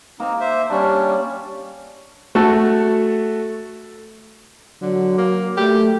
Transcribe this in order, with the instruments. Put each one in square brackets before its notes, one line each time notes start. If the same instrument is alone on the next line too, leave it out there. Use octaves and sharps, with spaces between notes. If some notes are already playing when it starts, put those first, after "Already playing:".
[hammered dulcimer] A#3 [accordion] C4 D#4
[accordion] C5 E5
[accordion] G3 [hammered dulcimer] C#4 D4
[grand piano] A3 F#4 A4 A5
[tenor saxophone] D3 [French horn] F#3
[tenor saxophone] A#3
[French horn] A3 [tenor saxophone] G4